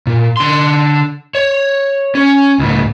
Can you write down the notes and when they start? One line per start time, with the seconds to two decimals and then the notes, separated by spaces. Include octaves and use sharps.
0.07 A#2
0.37 D3 C6
1.35 C#5
2.15 C#4
2.59 C#2 A2